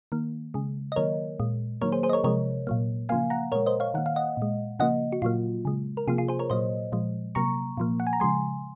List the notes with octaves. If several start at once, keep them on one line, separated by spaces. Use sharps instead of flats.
D#3 A#3
C#3 G#3
D#5
D#3 F#3 A#3 A#4 C#5
A#2 G#3
D#3 F#3 A#3 A#4 C#5
G#4 C5
G#4 C5
D#5
A#4 C#5
C3 F3 G#3 A#4 C#5
A#2 F#3 A#3
C#3 F3 A#3 F5 G#5
F#5 A#5
A#2 G#3 A#4 C#5
C5 D#5
C#5 F5
D#3 A#3 F#5
F5
D#5 F#5
A#2 G#3
C#3 F3 A#3 D#5 F#5
F#4
A#2 F#3 A#3 F4
C#3 G#3
A#4
C3 F3 A#3 F4 G#4
F4 G#4
G#4 C5
A#4 C#5
A#2 F#3 A#3 C5 D#5
A#2 F3 G#3
C3 F#3 A#3 A#5 C#6
A#2 F3 A#3
F#5
G#5
A#5
C#3 F3 G#3 G#5 C6